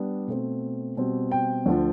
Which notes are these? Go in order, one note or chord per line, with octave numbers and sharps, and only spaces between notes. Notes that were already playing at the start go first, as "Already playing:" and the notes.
Already playing: G3 B3 D4
B2 A3 C4
B2 G3 C4
G5
D2 D3 F3